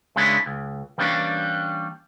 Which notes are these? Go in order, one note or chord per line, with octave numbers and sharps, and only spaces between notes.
C#2 C#3 G#3 D4 E4
C#2
E3 G3 A#3 C#4 D4